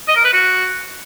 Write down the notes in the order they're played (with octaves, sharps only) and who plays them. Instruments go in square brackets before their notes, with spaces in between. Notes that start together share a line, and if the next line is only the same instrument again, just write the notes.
[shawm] D#5
A#4
B4
F#4